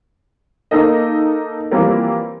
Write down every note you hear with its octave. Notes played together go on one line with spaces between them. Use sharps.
A#3 D#4 A4 A#4 D#5
E3 F3 G3 A#3 C4 A#4